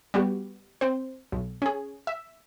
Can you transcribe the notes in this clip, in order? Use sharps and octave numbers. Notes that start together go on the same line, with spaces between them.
G3 B3 F#4 G4
C4 C5
B1
C#4 G#4
E5